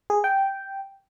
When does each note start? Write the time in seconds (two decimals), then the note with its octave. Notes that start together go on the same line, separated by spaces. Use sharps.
0.10 G#4
0.24 G5